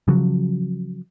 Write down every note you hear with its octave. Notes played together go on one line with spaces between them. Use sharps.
C#3 F3 F#3